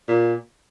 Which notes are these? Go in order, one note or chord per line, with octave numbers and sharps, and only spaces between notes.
A#2